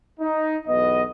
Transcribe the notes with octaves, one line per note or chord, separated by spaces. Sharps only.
D#4
B1 E2 B3 D#5